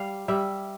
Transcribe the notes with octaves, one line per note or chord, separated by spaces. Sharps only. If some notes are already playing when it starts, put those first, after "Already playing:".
Already playing: G3 F5
G3 E5